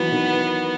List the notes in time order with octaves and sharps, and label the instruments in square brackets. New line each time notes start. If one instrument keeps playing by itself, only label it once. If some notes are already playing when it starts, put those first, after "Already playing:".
Already playing: [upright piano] E3 F#3 [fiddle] B3
[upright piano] D#3